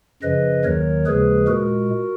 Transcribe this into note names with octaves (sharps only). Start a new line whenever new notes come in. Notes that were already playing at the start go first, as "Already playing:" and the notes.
F#2 C#3 F3 B4 D#5
D#2 D#3 F#3 A#4 C#5
D#2 C#3 F3 G#3 G#4 B4
A#2 G#3 F#4 A#4